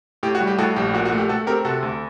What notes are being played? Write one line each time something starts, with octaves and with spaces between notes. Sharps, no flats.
A2 G4
F#4
G3
G4
A2 F#4 A4
A#1 G4
A#2 F#4
F#4
A3
G4
A3 F#4 A4
C4 G4 A#4
C3 F#4 A4
D2